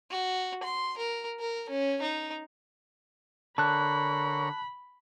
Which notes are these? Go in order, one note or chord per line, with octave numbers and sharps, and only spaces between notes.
F#4
C6
A#4
A#4
C#4
D#4
D3 A#4 C#5 A5 B5 F#6